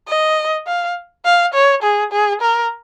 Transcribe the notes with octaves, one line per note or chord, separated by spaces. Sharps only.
D#5
F5
F5
C#5
G#4
G#4
A#4